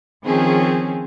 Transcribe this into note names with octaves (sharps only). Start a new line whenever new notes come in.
D#3 F3 C4 C#4 G#4